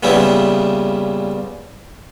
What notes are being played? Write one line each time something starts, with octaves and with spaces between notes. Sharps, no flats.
A#2 C#3 G3 B3 E4 G4